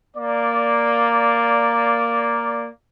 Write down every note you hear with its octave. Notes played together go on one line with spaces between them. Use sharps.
A#3 D5